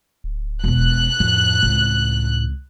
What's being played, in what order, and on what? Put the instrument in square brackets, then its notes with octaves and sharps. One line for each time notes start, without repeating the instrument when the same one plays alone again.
[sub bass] D1
[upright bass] E1 B2 [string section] F#6
[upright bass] F2 [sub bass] A2
[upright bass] C#2 C4